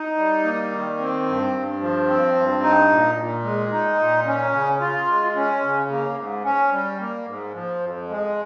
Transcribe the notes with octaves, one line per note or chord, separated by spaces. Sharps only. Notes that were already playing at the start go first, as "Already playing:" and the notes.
Already playing: D#4
G3
A#3
D#3
C4
G2
G2
F3
C4
G2
D#4
A#2
A#2
G#3
D#4
A#2
C#4
C#3
F4
G#3
C#4
C#3
A#3
G#2
C#4
G3
A#3
G#2
F3
F2
G#3